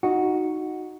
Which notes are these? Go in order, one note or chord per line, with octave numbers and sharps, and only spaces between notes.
D#4 F#4